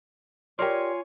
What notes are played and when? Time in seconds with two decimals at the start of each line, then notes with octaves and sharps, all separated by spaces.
0.59 F4 G4 A#4 C#5 D5 G#5